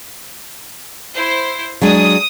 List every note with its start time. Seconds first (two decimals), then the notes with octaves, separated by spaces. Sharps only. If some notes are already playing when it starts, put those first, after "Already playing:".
1.15 E4 C5
1.82 F#3 G#3 D4 D#6